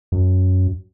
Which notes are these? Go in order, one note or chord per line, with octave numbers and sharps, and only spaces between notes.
F#2